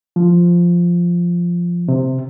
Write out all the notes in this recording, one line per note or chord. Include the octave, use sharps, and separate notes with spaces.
F3
C3